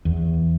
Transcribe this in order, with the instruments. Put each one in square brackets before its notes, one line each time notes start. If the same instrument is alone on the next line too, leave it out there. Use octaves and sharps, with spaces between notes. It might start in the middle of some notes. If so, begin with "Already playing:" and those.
[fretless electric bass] E2